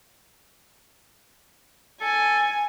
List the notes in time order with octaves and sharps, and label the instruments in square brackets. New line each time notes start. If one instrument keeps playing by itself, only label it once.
[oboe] A4 [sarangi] G#5